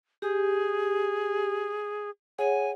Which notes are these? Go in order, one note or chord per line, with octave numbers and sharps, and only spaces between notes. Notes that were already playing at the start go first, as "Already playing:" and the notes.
G4 G#4
G#4 C#5 F#5 G#5